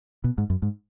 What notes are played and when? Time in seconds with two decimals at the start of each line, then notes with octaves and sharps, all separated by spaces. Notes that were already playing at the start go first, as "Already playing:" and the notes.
0.24 B2
0.38 G#2
0.50 F#2
0.62 G#2